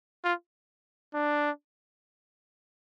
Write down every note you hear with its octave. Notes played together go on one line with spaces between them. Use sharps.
F4
D4